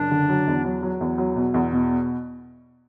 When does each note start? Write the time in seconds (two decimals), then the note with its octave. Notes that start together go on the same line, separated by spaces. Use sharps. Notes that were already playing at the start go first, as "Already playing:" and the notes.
Already playing: F#1 D4
0.11 D3
0.29 F#3
0.47 E2
0.65 F#3
0.83 F#3
1.01 E2
1.18 F#3
1.36 B2
1.54 E2
1.73 B2